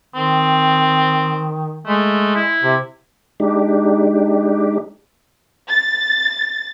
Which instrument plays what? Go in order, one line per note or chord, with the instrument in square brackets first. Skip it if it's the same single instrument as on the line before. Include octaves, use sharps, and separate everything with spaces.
[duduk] D#3 [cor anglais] C4
[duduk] G#3 [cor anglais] A3
[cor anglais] E4
[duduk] C3
[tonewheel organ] G#3 D4 D#4 G4
[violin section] A6